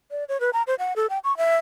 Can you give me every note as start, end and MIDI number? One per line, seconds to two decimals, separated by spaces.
0.11 0.24 74
0.29 0.40 73
0.40 0.50 71
0.53 0.63 82
0.67 0.75 72
0.79 0.93 78
0.96 1.07 69
1.10 1.19 79
1.24 1.36 85
1.37 1.56 76